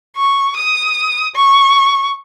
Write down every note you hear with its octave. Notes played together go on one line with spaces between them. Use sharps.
C#6
D#6
C#6